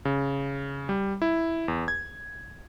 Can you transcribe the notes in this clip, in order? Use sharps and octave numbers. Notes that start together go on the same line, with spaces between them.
C#3
G3
E4
E2
G#6